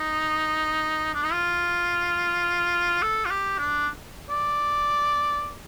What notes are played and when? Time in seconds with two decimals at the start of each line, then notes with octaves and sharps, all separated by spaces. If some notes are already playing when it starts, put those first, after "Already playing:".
Already playing: D#4
1.14 D4
1.23 D#4
1.32 F4
3.02 A4
3.25 F4
3.30 G4
3.58 D4
4.30 D5